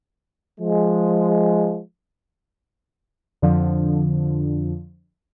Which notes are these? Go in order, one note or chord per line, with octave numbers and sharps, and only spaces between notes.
F3 G#3
F2 D3 F3